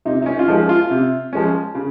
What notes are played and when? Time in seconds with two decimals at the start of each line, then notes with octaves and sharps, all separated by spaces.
0.05 C3 D#4
0.22 D#4
0.26 C#4
0.39 F4
0.48 F3 G#3 C#4 D#4
0.69 F4
0.90 C3
1.33 F3 G#3 C#4
1.75 C#3